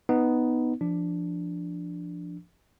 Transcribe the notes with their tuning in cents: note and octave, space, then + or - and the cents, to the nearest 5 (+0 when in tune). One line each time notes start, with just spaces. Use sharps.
B3 +5 D#4 +0
F3 -20 D4 +0